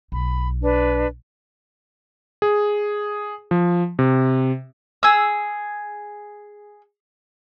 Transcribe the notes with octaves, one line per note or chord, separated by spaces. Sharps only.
B1 B5
D4 B4
G#4
F3
C3
G#4 E6